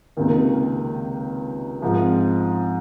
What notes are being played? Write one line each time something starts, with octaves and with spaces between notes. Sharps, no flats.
C#2 C3 D#3 A#3
G#2 F3 C4 F4